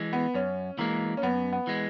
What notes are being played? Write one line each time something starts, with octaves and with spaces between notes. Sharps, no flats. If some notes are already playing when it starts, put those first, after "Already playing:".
Already playing: E3 G#3
B3
F#2 C#4
E3 G#3 A#3
C#4
F#2 B3
B3
E3 G#3